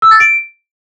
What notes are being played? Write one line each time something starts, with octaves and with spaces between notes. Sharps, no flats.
E6
A6
D7